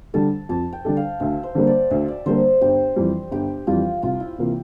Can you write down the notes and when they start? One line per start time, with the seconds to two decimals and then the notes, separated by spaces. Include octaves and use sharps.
0.14 D3 G3 D4 A4 A5
0.49 F2 A5
0.73 G5
0.85 D3 G3 D4 A4
0.97 F5
1.20 D2 E5
1.43 C5
1.55 D3 G3 A#3
1.67 D5
1.91 D2 E5
2.08 D5
2.26 D3 G3 A#3 C5
2.61 G1 G4
2.96 F2 E3 G3
3.31 G1 G4
3.67 F2 E3 G3 F4
4.03 C2 F4
4.20 E4
4.38 C3 E3 A#3 F4